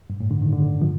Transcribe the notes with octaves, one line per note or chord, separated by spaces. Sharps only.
G2
A2
D3
D#3
D3
F3